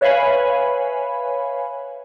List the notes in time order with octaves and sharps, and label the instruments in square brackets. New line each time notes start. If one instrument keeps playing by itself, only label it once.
[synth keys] B4 C#5 E5 F5 G#5 B5